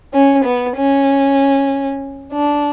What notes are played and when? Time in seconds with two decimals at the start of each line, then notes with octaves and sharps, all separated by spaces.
0.14 C#4
0.45 B3
0.77 C#4
2.33 D4